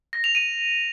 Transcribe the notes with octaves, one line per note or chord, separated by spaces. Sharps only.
A#6
F7
D#7